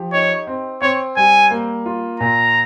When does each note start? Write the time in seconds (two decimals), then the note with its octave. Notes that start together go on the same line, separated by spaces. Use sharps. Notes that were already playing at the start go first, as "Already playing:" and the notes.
Already playing: F3 G4
0.13 D#4 C#5
0.47 C4
0.82 C4 C#5
1.16 G3 G#5
1.51 A#3
1.86 F4
2.20 A#2 A#5